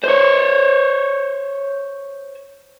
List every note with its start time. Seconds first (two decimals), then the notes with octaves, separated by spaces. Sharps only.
0.04 C5 C#5